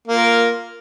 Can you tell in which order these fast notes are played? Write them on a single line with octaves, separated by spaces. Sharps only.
A#3 F4 A#4